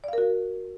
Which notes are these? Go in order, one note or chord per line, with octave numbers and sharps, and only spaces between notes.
F#4 A#4 D5 F5